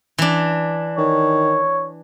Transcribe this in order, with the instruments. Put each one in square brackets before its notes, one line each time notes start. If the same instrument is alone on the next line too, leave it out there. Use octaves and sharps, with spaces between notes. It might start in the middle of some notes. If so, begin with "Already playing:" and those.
[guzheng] E3 D4
[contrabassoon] D#3 [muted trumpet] C#5